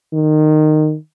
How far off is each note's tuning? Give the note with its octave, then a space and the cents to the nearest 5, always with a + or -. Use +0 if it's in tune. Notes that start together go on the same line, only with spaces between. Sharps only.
D#3 -20